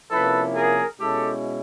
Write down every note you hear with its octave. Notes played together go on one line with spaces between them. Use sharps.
C3 F3 A#3 C#4 E4 A4 B4
G#4 A#4
B2 G#3 C#4 E4 G4 A4